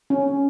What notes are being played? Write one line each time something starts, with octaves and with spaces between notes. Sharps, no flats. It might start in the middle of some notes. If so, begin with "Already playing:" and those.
C#4